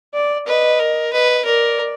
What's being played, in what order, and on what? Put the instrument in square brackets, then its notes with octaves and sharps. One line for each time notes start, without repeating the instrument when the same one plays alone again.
[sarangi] D5
[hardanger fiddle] B4 [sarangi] D#5
[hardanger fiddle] A#4
[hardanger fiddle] B4 [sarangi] D#5
[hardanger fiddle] A#4 [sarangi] D5